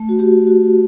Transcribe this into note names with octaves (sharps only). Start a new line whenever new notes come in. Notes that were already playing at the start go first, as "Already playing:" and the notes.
Already playing: A3
F#4
F#4 G4
F#4